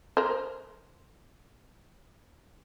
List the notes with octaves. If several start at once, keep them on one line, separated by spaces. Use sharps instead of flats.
A#4 C5